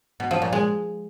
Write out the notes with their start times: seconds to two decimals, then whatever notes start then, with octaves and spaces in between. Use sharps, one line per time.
0.20 B2
0.31 F3
0.42 A#2
0.53 G#3